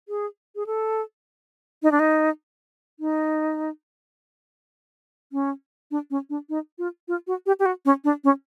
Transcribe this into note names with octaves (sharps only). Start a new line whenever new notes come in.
G#4
G#4
A4
D#4
D4
D#4
D#4
C#4
D4
C#4
D4
D#4
F4
F4
F#4
G4
G4
F#4
C#4
D4
C#4